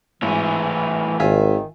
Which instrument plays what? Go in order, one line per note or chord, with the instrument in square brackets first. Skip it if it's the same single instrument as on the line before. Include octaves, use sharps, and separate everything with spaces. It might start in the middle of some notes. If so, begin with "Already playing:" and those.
[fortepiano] G#1 [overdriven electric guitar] A2 G#4 [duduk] E3
[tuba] G#1 [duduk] D#3 [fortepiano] F4 E5 G#5